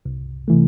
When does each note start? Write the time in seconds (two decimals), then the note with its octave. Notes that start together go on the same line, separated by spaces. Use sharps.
0.05 C2
0.48 C3 E3 A3